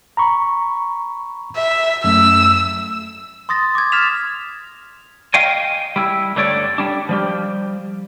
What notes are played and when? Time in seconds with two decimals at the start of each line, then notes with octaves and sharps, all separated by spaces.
0.17 A#5 B5 C#6
1.56 E5
2.04 F#2 A3 E6
3.49 C6 D#6 A6 A#6
3.75 D6 G#6
3.92 F6 A6 B6 E7 F7
5.34 D#5 F5 G5 G#5
5.96 G3 E4
6.36 G2 D3 A3 C#5 D5
6.78 G3 D4
7.09 F3 G3 G4